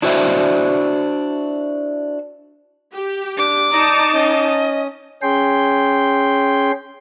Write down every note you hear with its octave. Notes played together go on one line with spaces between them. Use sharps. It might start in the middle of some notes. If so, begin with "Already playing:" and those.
D4 E4 F#4 C5 D5 E5
G4
D4 D6
D#4 D5 A5 A#5
C#4 D#5 D#6
C#4 G#4 G5 C6